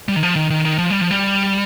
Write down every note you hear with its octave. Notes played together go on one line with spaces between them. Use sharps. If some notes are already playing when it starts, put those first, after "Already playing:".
G3
D#3
F3
D#3
D#3
D#3
F3
G3
F3
G3